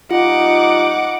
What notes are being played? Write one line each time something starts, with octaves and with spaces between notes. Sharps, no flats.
G3 D#4 F4 F#5 D6